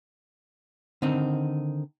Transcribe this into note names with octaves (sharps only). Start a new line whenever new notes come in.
D3 D#3 C4 D#4